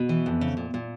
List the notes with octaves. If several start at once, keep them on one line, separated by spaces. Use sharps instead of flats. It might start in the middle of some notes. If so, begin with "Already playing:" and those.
Already playing: B2
E3
F2
C#3
A#2
A#2